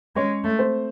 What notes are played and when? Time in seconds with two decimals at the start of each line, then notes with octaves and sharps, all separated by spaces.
0.16 G#3 C#4 C#5
0.44 A3
0.58 C4 C5